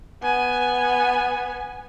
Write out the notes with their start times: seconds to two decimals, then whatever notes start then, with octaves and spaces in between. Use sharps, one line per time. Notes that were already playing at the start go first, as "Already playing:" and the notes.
0.22 B3 G#5